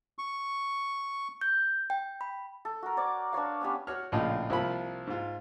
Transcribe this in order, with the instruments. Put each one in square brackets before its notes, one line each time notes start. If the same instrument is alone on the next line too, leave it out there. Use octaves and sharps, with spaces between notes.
[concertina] C#6
[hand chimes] G6
G5
B5
[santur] A4
F#4 A#4
C#5 D5 D6
D4 B4 C#5 F5
G3 B3 C#4
[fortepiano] F#4 C#5 F6
A#1 A2 C#3 F4 D#5
C2 F3 A#3 F4 B5
G#2 F4